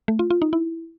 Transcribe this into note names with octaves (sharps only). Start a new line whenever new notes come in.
A3
F4
F4
D#4
E4